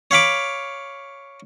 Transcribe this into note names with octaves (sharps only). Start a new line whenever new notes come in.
C#5 F5 B5 D6